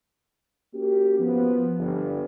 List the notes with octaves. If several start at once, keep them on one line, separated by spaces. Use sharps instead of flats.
A#3 C#4 F#4 G4
F3 B3
G1